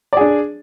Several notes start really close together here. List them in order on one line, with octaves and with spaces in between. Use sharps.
D5 G#4 D4